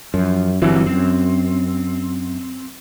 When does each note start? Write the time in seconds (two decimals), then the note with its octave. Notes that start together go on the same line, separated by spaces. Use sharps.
0.14 F#2 F3
0.62 G1 E3 F#3 G3 C4
0.86 F#2 C4